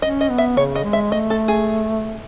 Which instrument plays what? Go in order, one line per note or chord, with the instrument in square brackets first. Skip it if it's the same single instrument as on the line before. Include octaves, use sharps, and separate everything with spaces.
[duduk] C#4 [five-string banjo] D#5
[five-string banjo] D#5
[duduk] B3
[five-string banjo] E5
[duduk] C#3 [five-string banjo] C#5
[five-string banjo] D#5
[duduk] G#3
[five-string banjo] E5
[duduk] A3 [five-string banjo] D#5
[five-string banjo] A4
G#4